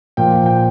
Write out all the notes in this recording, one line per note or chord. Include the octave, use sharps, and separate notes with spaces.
A#2 F3 G5
G5